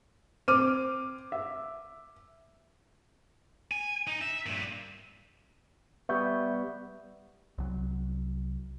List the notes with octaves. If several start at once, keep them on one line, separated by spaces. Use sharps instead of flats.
C4 D6 F6 D#7
E5
G#5
D#4
E5
G2 A#2
G3 B3 E5 C#6 G6
C2 F#3